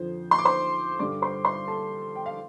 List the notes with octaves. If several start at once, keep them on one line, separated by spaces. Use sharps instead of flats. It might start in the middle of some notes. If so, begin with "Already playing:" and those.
Already playing: F2 D3 F3 C5
C6
D6
C5 C6
G2 D3 G3 D5 D6
C5 C6
C5 C6
A4 A5
G5
F5